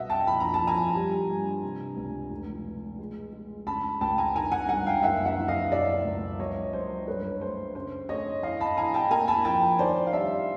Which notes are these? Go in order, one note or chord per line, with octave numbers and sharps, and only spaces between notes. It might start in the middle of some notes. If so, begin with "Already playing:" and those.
Already playing: C2 B2 D#5 E5 F#5
G5 A5
A#1 B5
A#5
A5
F3
G#5 A#5
G3
G2
C3
C#2
F1
B2
G#3
G#3
C#3 A5 B5
C#2 G5 A5
G#5 A#5
D#3 G#5 A#5
F#5 G#5
G2 F#5 G#5
F5 G5
F#1 E5 F#5
E5 F#5
F#1
D#5 F5
B2 D5 E5
C#2
F#3 C#5 D#5
F#2 C5
G2 B4 C#5
A3 C5
C#3 C5
A3 C#5 D#5
A1 D#5 F5
A5 B5
A1 G#5 A#5
G5 A5
A#3 G#5 A#5
A5 B5
F3 G5 A5
D#3 C5 D5
F5
G3 D5 E5